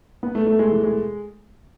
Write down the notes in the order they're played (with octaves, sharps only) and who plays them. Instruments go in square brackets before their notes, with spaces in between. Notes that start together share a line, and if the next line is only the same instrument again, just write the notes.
[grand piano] B3
A3
A3
G#3
E3
G#3